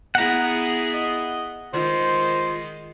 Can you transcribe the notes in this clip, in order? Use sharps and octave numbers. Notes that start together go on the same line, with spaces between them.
B3 E4 G#4 F#5 A#5
D#5
D#3 G#3 F4 C5